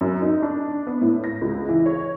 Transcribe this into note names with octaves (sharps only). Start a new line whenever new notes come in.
F#2
D#4
D4
B3
A2
A#6
C#2
E3
C#5